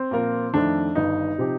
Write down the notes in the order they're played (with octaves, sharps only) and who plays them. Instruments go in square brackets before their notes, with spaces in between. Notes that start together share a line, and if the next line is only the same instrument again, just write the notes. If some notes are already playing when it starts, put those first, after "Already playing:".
Already playing: [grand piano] C4
[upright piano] A#2 F3 A#3 F4 A#4
[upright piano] F2 D#3 A3 [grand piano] D4
[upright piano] G1 G2 D#3 [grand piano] D#4
[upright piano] C3 F3 C4 G4